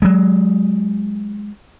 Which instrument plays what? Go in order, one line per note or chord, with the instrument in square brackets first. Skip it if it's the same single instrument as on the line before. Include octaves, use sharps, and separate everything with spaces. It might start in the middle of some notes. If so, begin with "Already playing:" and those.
[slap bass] F#3 G#3